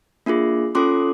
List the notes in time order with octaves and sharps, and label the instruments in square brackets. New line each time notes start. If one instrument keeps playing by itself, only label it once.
[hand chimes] A#3 D4 F4 G#4
C#4 F4 A4 C6 D6